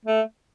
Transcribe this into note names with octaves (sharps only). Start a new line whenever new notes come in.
A3